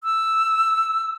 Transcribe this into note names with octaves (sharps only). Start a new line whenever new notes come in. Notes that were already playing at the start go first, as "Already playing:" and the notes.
E6